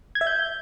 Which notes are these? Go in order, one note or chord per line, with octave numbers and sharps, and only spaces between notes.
G#6
E5
G6